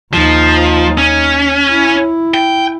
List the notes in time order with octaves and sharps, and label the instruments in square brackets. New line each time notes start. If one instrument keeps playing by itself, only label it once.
[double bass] D#2 D#4 [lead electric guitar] F3
[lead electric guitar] C#4
[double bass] E4
[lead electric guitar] G5